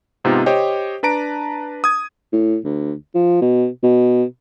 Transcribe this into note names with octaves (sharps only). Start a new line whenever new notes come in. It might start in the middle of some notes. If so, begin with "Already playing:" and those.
G#2 C3 B3 D#4 F4 G4
G4 C5 C#5 D#5 G5
D4 B4 A5 A#5 D7
D#6 G#6
A2
D2
F3
B2
B2